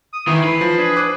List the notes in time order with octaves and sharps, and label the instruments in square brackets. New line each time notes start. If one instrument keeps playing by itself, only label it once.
[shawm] D#6
[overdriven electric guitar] D#3 [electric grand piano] E3 E4 [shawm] C5
[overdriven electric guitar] B4
[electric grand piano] F3
[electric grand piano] D4 [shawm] G#4
[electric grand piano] C5 D6 F#6